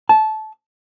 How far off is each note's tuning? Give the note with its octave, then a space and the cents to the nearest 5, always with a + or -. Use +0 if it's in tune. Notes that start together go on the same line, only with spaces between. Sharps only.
A5 -20